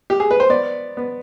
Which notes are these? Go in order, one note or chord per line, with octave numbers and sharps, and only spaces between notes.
G4
G#4
B4
C5
B3 D5
B3